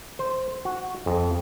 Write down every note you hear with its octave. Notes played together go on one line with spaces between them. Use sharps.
C5
F#4
F2